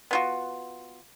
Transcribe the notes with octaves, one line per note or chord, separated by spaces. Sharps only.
B3 F4 F#4